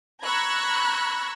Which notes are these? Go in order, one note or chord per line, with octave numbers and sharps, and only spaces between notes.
A#5 B5 C#6 E6 F#6 G#6